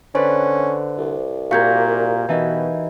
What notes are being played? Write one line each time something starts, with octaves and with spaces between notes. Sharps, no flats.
D3 C#4 B4 C5 D5 B5
C2
A#2 F#4 G4 A#4 F5 G6 G#6
B2 E3 D#4